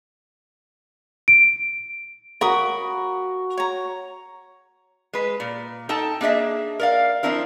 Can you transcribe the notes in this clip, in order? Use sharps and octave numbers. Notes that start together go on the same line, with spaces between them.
D7
F#4 A#4 B5 D#6
C#5 A#5
G#3 B4
A#2
D#4 A4 G5 A5
A#3 D4 G#4 D#5 E5
A#4 D5 F5
F3 C4 D4 E4 A#4